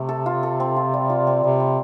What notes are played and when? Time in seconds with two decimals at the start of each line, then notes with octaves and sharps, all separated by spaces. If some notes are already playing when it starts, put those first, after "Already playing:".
Already playing: C3 A3
0.09 A4
0.26 F4
0.43 A4
0.60 C4
0.76 F4
0.94 G3
1.10 F4
1.27 C4
1.44 C3 G3
1.60 G3